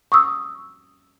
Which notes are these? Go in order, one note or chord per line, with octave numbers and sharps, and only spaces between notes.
C#6 D#6 E6